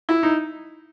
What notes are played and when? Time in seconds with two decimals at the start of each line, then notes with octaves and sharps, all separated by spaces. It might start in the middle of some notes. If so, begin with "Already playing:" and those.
0.09 E4
0.23 D#4